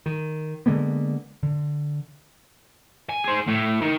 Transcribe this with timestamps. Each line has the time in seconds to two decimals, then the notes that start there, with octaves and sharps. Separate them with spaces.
0.06 D#3
0.66 D3 G#3 A#3 B3
1.42 D3
3.09 G#5
3.24 G#4 C5
3.47 A2 A3
3.81 D#3